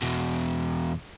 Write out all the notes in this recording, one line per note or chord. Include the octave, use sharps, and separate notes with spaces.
E2 B2